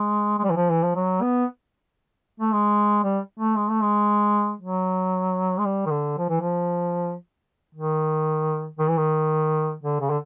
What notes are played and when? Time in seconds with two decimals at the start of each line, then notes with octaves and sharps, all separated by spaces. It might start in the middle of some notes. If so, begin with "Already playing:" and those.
Already playing: G#3
0.38 G#3
0.44 G3
0.50 E3
0.56 F3
0.70 E3
0.83 F3
0.96 F#3
1.22 B3
2.40 A3
2.53 G#3
3.04 G3
3.40 A3
3.56 G#3
3.69 A3
3.83 G#3
4.61 F#3
5.58 G#3
5.65 G3
5.86 D#3
5.91 D3
6.18 F3
6.29 E3
6.41 F3
7.75 D#3
8.79 D#3
8.88 E3
8.97 D#3
9.83 D3
10.01 C#3
10.10 D3